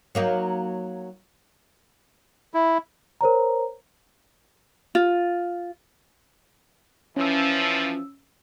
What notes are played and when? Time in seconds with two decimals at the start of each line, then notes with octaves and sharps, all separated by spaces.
0.15 F#3 A#3 D#4
2.54 E4
3.21 A#4 C5 C#5 A#5
4.95 F4
7.17 E3 F3 C#4 E6